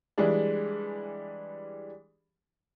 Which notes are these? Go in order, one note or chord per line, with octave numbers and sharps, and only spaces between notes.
E3 G3 G#3 D4